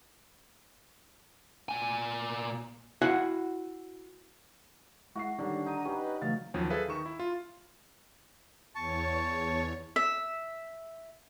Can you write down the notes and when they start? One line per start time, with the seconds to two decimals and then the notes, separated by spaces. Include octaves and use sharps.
1.69 A#2 G#5
3.02 E4 F#4 F5 F#5 G#5
5.15 G#3 E4 F#4 F#5 C7
5.38 D3 D#3 G3 D4 C#5
5.66 D4 D#4 A#5 D#7
5.85 C#4 D#4 G4 B4 D#5
6.22 C#3 E3 F#3 A3 F5 A6
6.54 D#2 F3 F#3 C#4
6.70 G#4 A4 B4 E5 F5
6.88 D#3 D#4 C#6 E7
7.06 E4
7.20 F4
8.75 E2 C#5 A5 C#6
9.96 E5